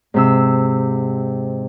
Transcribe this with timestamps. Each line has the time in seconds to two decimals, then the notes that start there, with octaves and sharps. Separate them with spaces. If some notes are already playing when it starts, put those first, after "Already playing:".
0.14 G#2 C3 E6